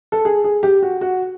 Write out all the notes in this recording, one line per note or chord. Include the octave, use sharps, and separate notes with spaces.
A4
G#4
G#4
G4
F#4
F#4